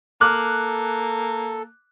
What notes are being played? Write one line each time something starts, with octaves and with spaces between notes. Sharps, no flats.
A#3 A4 D6 F6 F#6